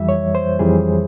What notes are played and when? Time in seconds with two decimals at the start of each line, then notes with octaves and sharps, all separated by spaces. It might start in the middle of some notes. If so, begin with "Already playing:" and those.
Already playing: F2 E3 G3 E5
0.09 C#5
0.35 C5
0.59 F2 E3 G3 G#4